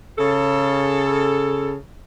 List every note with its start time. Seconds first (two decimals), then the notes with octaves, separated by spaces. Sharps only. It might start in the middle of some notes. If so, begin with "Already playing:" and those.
0.18 C#3 A4